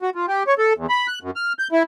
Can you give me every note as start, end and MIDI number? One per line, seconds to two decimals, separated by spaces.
0.02 0.10 66
0.15 0.26 65
0.28 0.43 67
0.47 0.54 73
0.58 0.73 69
0.77 0.86 40
0.90 1.07 83
1.08 1.19 90
1.23 1.31 42
1.36 1.53 89
1.59 1.68 91
1.72 1.83 64